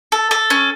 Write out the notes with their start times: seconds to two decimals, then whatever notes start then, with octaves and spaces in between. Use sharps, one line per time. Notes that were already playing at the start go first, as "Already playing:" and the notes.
0.12 A4
0.31 A4
0.50 C#4